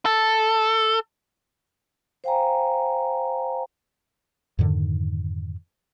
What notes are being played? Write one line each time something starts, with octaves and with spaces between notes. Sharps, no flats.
A4
C5 F5 G5 G#5 A#5
F2 G#2 D3 D#3